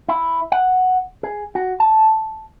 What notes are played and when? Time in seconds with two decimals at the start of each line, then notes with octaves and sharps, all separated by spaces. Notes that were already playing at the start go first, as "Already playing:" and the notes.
0.08 E4
0.52 F#5
1.23 G#4
1.55 F#4
1.80 A5